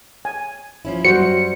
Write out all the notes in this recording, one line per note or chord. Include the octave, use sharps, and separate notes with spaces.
G#5
F3 C#4 E4
F#2 F#3 G3 F#4 C5 C#7